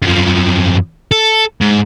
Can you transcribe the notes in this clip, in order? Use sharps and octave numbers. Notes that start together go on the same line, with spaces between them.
F#2 F3
A4
G#2